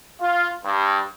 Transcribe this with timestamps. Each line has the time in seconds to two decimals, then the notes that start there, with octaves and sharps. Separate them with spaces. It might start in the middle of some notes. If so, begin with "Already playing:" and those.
0.21 F4
0.66 G2